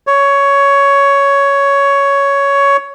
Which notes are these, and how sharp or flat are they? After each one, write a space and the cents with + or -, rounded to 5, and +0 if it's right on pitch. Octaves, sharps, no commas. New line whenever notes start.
C#5 +10